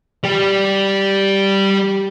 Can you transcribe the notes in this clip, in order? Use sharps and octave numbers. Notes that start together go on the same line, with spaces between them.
G3 G4